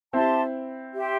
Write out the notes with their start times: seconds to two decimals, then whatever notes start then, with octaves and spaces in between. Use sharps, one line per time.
0.13 C4 E4 G4 E5 A5 C6
0.95 G4 E5 G5 C6